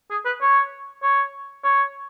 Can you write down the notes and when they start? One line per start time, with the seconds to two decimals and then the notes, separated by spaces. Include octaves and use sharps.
0.11 G#4
0.25 B4
0.42 C#5
1.03 C#5
1.64 C#5